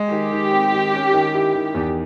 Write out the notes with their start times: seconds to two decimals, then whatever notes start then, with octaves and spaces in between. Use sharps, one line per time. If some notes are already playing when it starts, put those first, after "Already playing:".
Already playing: G#3
0.11 D#3 G4
0.32 D#3
0.52 C4
0.72 D#3
0.94 C#4
1.13 D#3
1.34 E4
1.54 D#3
1.75 E2